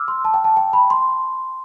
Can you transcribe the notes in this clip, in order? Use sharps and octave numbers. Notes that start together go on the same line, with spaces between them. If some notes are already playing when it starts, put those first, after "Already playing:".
Already playing: D6 E6 F6
C6
A5
G5
A5
G5
B5
C6